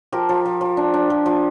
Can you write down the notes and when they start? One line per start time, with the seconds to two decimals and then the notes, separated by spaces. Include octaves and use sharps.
0.12 F3 G4 A#4
0.29 F3
0.45 F3
0.61 F3
0.77 D4
0.94 D4
1.10 F3
1.26 F3